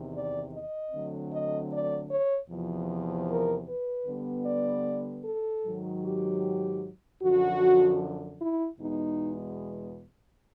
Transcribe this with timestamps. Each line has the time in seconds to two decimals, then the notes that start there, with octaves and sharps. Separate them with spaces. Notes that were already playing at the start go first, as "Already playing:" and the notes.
Already playing: E2 C3 D#3
0.13 D5
0.53 D#5
0.92 D3 F#3 A3 C4
1.32 D#5
1.70 D5
2.10 C#5
2.50 E2 C3 F3
3.28 A#4
3.68 B4
4.07 D3 G3 B3
4.46 D5
5.25 A4
5.64 G#2 D#3 F#3
6.03 G4
7.21 F#2 D3 F3 F#4
8.40 E4
8.79 E2 B2 G#3 B3 D#4